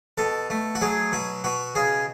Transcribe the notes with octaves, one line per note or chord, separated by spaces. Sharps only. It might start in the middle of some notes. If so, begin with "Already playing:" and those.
B2 A4
A3
F#4
F#3 G#4
B2 F#4
B2 F#4
C#3 G#4